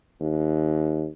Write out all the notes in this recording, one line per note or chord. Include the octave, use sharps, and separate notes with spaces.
D#2